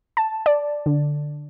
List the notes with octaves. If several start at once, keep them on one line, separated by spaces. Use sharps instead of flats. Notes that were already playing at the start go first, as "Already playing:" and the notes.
A5
D5
D3